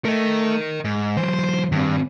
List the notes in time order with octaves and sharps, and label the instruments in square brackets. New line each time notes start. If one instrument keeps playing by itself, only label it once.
[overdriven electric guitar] A3 [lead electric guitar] A#4 D#5
[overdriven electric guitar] G#2
[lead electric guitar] E3 F#3 [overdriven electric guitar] C5
[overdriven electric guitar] G2 [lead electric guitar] D#3 C4